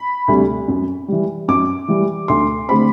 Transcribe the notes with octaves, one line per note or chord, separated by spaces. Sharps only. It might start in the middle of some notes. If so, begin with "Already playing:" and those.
Already playing: B5
D2 C3 G3
F#2
E3 G3
F#2 D6
E3 G3
D2 C6
D3 A3 C4 B5